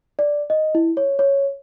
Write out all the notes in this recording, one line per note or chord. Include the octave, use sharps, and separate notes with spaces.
D5
D#5
E4
C#5
C#5